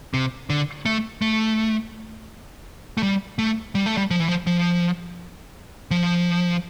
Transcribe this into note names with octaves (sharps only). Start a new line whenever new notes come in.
C3
D3
A3
A3
A3
G3
A3
G3
A3
G3
F3
E3
F3
F3
F3